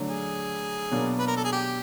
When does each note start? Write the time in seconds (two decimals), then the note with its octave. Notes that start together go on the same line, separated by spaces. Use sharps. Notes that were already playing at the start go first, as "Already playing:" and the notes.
Already playing: D3 F#3 A3 D4
0.09 G#4
0.91 B2 F#3 A#3 D4
1.19 B4
1.28 A#4
1.37 A4
1.45 G#4
1.53 G4